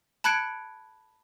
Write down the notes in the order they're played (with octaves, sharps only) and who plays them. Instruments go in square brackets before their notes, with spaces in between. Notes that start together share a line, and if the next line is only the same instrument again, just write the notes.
[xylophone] A5 B5 F#6 G#6 C#7 D7